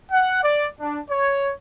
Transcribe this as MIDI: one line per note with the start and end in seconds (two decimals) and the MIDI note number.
0.11 0.42 78
0.42 0.67 74
0.80 0.99 62
1.10 1.52 73